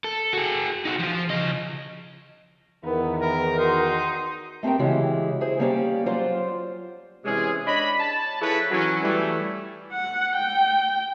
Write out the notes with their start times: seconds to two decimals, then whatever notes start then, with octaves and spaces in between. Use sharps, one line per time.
0.04 A4
0.33 F#4 G#4
0.85 D#4 F#4
0.99 F3 F4
1.30 C#3 D#5
2.84 E2 D#3 B3 E4
3.21 A#4
3.59 D#4 F#4 C6
4.63 A3 C4 G4 A#4 G5
4.79 C#3 E3 G#3 E4 F#4 G4
5.41 E4 G#4 C5
5.59 G3 A#3 C#4 G4 C#5 D5
6.06 F#3 F4 C5 D5
7.25 C3 E3 G#3 C#4 G#4
7.67 D4 C#5 D#5 B5
8.00 A5
8.41 F3 E4 G#4 A4 B4 C#5
8.70 E3 F#3 C#4
9.03 E3 G3 A3
9.93 F#5
10.36 G5